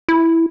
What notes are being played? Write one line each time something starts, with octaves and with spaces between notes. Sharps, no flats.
E4